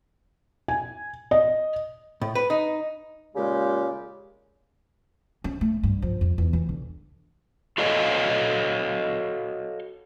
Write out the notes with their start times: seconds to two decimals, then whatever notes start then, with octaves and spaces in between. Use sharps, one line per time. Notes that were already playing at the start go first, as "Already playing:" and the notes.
0.68 G#5
1.31 D#5
2.22 A2
2.35 B4
2.50 D#4
3.35 A#2 C#3 G#3 G4
5.44 C#4
5.61 A3
5.83 G2
6.02 F3
6.21 F2
6.38 E2
6.53 E3
6.69 D3
7.78 F#4 A4 C#5 D#5 F5 G#5